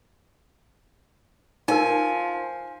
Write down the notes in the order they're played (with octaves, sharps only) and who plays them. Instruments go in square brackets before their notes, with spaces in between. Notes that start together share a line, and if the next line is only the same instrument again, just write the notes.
[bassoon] F3 [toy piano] D#4 A#4 [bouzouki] G#5